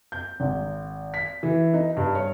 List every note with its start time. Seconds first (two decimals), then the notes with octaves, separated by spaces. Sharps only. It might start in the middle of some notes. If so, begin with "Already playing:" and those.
0.12 G6
0.40 G#1
1.14 B6
1.43 E3
1.74 D#4
1.97 G2
2.15 C#5